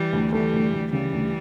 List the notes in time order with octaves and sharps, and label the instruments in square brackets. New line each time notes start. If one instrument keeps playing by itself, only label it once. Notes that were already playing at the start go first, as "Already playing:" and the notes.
Already playing: [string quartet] E3 G3
[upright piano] D2
[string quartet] E3 G3 [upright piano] A3
[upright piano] D2
D2
[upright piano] C#3 [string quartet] E3 G3
[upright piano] D2